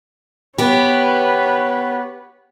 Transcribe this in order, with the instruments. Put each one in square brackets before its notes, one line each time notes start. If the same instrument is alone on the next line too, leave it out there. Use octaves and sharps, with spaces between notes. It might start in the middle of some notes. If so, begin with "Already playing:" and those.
[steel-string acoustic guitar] B3 G4 [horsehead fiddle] B4 C#5